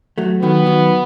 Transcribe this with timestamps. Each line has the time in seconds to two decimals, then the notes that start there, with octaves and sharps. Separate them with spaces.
0.18 F#3 A3
0.42 D#3 F#3 B3
0.66 D#3 F#3